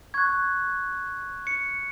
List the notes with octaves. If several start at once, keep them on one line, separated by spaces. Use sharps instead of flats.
C#6 F#6 G#6
C#7